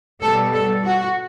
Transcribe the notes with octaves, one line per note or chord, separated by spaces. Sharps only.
B2 G3 A4
A4
F#4